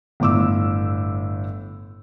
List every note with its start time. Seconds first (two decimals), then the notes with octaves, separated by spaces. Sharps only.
0.20 G1 A2 D6 E6